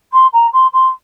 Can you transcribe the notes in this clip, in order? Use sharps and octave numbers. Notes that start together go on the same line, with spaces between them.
C6
A#5
C6
C6